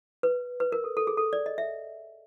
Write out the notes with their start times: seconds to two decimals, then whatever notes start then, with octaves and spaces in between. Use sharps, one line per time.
0.23 B4
0.60 B4
0.72 A#4
0.84 A4
0.97 A4
1.07 G#4
1.17 A4
1.33 D5
1.46 D#5
1.58 E5